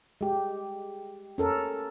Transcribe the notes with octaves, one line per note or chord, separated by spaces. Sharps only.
G#3 G4
C#4 A4 A#4